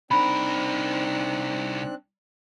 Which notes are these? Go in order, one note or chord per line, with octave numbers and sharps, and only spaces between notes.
C2 C4 D4 D#4 A#4 B5 F#6